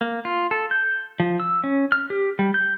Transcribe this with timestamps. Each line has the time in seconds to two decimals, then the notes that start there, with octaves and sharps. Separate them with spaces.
0.01 A#3
0.25 F4
0.51 A4
0.71 G6
1.20 F3
1.40 E6
1.64 C#4
1.92 F6
2.10 G4
2.39 G3
2.54 G6